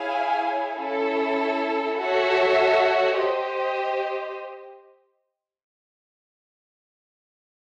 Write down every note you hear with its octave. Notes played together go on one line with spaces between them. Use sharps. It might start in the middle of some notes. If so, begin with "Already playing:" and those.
Already playing: E4 G#4 C#5 F5 G#5
C#4 E4 A4
F#4 A4 C#5 E5
G4 C5 D#5